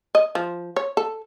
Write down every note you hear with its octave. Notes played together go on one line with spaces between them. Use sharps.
D#5
F3
C#5
A4